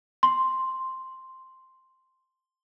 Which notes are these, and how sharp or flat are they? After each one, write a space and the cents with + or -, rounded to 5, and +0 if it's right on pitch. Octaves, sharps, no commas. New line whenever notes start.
C6 +0